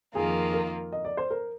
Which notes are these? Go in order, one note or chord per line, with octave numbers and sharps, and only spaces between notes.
F2 D#3 A#3 F4 G#4
A#4
D#5
D5
C5
A#4